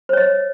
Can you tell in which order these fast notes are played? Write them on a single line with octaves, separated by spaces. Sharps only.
C5 C#5 D#5